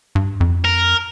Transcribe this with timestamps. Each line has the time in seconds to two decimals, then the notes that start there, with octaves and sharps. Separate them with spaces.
0.15 G2
0.40 F2
0.65 A#4